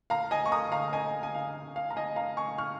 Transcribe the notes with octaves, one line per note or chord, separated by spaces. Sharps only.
F5 A#5
D#5 G#5
C#6
A#5 D#6
F5 A#5
D#5 G#5
G#5
F5
F5
A#5
D#5 G#5
F5 A#5
G#5 C#6
C#6 F6